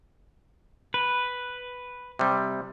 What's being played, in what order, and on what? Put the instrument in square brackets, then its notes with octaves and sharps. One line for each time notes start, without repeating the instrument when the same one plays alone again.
[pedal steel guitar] B4
[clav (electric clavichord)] C3 G3